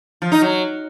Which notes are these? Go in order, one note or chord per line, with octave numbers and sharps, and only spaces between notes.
F3
D#4
F#3